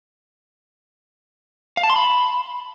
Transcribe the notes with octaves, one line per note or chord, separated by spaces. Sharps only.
F5
A5
C6
B5